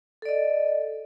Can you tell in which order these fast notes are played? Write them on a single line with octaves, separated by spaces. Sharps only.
A4 D5 D#5